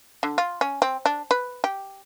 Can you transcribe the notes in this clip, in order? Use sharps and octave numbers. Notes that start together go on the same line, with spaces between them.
D3
F4
C#4
C4
D4
B4
G4